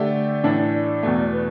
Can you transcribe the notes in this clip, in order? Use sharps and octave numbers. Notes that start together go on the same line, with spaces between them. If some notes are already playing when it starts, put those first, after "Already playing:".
Already playing: D3 A3 G4 D5 E5
A2 E3 A3 D4
D5
E2 B2 A3
B4